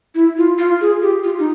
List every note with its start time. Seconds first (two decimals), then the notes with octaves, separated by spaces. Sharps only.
0.15 E4
0.38 F4
0.58 F4
0.81 G#4
1.02 G4
1.24 F4
1.39 D#4